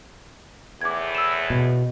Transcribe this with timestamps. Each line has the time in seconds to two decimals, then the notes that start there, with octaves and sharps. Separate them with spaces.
0.81 E2 A2 D6 G#6
1.15 E6 E7
1.50 B2